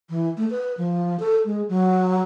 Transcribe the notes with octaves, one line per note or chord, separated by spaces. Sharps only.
E3
A3
B4
F3
A4
G#3
F#3